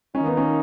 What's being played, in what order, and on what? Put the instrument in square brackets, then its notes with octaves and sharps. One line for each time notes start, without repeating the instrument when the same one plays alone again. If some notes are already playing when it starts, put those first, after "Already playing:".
[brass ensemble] D#3 A#3 D#4 [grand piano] C#4
[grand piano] B3
C#4